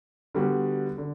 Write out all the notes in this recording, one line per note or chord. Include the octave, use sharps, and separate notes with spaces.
D3 G3 B3 F#4
D3